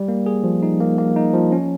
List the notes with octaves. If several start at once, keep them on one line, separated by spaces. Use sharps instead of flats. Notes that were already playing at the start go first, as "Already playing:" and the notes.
Already playing: G3
A#3
G#4
F3
D#4
A#3
A#3
D#4
F3
C#4